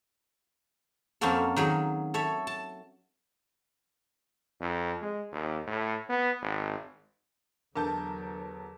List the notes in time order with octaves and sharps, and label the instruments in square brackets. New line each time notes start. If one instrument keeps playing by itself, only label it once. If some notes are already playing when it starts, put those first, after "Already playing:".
[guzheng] F2 A#3 C4 C#4 F#4 A4
D#3 F#3 G#4
A4 C#5 E5
A5
[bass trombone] F2
G#3
D#2
A2
B3
G#1
[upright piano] E2 A4 G6 [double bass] D3 F#3 [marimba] D4 [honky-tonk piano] A#4 A5